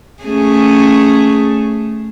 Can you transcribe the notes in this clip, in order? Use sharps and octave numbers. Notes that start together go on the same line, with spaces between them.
A3 C#4 G#4